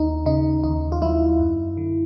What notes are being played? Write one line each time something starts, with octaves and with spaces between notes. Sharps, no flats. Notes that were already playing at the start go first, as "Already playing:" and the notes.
Already playing: D#2 D#4
C#3 D#4
D#2 D#4
F4
F#3 E4
F#2
D3